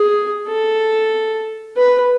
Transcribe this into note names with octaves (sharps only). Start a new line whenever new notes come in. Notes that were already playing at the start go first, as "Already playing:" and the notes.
Already playing: G#4
A4
B4